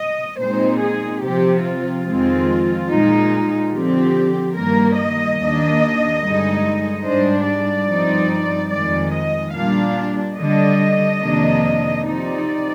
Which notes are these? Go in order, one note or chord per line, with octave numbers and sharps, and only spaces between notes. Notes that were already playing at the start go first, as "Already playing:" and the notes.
Already playing: D#5
A#2 G#3 C4 D#4 C5
G#4
C3 F3 C4 G4
F4
F2 D#3 G#3 C4
A#2 G#3 D#4
D3 F3 C4 G4
G2 D#3 A#3 A#4
D#5
D#2 D#3 A#3 D4
G2 D3 G#3 D#4
G#2 G3 D4 C5
D5
G2 F3 C4 D#4
F2 D#3 G#3 D5
D#5
A#2 G3 D4 F5
D3 G3 D4 D#5
F2 C3 D#3 A#3 D4
C3 F3 C4 D#4 D5